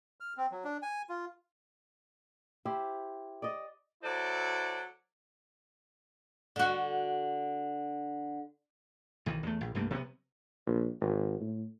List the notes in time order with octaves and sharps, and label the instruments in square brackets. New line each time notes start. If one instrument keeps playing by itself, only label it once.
[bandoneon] F6
C4
F#3
D4
G#5
F4
[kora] E4 G4 C5
D5 D#5
[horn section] F#3 E4 A4 C5 D5
[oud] D3 F#4
[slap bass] B1 D#3 E3
E2 A3
A#1
C2 G2 A3 A#3
C3 F#3 A#3 B3
[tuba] A#1
G#1
A2